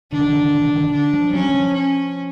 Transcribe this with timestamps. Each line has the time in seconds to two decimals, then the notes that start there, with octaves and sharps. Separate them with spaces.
0.12 D3 D4
0.19 D#3
0.26 D3
0.33 D#3
0.40 D3
0.47 D#3
0.55 D3
0.61 D#3
0.69 D3
0.76 D#3
0.83 D3
0.93 D4
1.13 F3
1.33 F#3 C#4
1.49 E3
1.54 F3
1.74 C#4